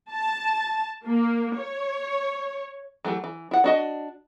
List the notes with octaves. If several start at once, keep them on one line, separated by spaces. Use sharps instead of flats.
A5
A#3
C#5
E3 F#3 A3 G4
E3
E4 F#5
D4 F#4 D#5